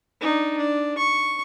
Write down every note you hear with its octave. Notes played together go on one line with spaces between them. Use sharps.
D4 D#4
D4
C#6